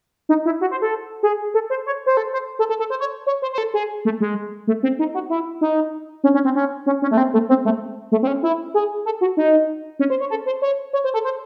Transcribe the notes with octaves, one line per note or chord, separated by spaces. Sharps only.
D#4
E4
F#4
C5
A4
G#4
A4
C5
C#5
C5
A4
C5
A4
A4
A4
C5
C#5
C#5
C5
C5
A4
G#4
A3
G#3
A3
C4
D#4
F#4
E4
D#4
C#4
C#4
C4
C#4
C#4
C#4
A3
C4
A3
C4
A3
A3
C4
C#4
E4
G#4
A4
F#4
D#4
C#4
C5
C#5
A4
C5
C#5
C#5
C5
A4
C5